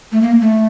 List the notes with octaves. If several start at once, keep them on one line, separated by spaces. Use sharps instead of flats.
A3
A#3
A3